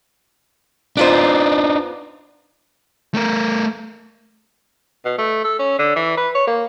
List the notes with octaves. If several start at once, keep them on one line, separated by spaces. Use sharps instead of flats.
B3 D4 D#4 F4 C5
A3 A#4
B2
A3
A4
C#4
D3
E3
B4
C#5
A#3